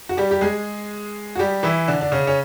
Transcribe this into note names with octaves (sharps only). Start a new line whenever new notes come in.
F#4
G3 G4
G4
G#3 G#4
F#4
G3 G4
E3 E4
D3 D4
D4
C#3 C#4
C#4